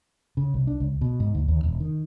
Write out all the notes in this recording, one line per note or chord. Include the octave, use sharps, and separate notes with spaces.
C#3
C2
D4
C#2
B2
G#2
D2
D#2
E1
D#3